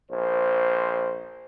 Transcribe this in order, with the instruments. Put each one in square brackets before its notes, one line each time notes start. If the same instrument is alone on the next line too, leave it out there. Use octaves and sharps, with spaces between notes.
[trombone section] A#1 C5